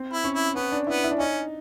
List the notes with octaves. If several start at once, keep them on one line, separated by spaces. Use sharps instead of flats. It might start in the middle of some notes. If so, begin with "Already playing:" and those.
Already playing: C4
E4
C#4
E4
B3 C#4
D4
B3 E4
E4
D4
C#4 D#4